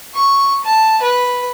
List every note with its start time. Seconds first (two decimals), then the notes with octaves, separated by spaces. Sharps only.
0.14 C#6
0.64 A5
1.02 B4